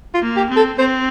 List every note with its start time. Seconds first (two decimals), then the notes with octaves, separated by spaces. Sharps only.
0.14 F4
0.22 A#3
0.36 G4
0.50 C4
0.56 A4
0.78 C4 C5